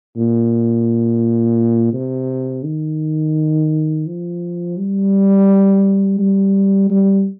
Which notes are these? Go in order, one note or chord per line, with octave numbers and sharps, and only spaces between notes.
A#2
C3
D#3
F3
G3
G3
G3